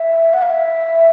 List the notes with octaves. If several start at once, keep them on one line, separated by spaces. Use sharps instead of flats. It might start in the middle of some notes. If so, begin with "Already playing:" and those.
Already playing: E5
F#5
F5
E5